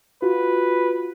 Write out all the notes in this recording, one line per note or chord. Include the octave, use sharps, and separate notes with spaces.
F4 F#4 B4